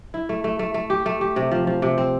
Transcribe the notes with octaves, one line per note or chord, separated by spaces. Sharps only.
E4
A3
A3
A3
A3
G4
A3
G4
C3
F3
F3
C3
C4